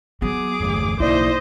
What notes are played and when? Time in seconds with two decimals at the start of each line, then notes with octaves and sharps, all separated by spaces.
0.22 F#3 B3 G#4 D6
0.60 G1 E2 A3
1.00 B1 G#2 A#3 E4 C5 D5 D#5